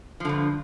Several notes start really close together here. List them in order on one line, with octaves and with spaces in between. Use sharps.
F3 D3 G2